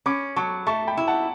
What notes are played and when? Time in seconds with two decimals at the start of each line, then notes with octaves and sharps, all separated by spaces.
0.06 C#4 B5 D6
0.36 F#3 A5 C#6
0.67 A3 A5 C#6
0.87 G5 B5
0.97 E4
1.08 F#5 A5